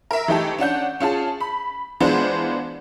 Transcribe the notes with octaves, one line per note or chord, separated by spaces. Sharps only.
A#4 E5
E3 A3 D#4 G4 A4
C#4 D4 F#5 G6
C#4 F4 G#4 A5
B5
E3 G#3 B3 D4 F4 C5